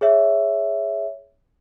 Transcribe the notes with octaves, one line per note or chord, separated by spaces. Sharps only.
G#4 C#5 E5